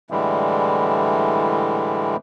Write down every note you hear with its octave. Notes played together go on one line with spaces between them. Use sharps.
A2 D3 E3 G3 G#3